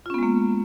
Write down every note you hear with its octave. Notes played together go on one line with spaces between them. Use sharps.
G#3 A#3 B3 C#4 F4